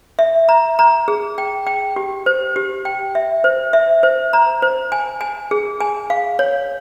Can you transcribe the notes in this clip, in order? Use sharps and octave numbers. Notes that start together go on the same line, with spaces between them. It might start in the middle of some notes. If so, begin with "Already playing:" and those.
E5
A#5
A#5
G#4
G5
G5
G4
C5
G4
G5
E5
C5
E5
C5
A#5
C5
G#5
G#5
G#4
G#5
F5
C#5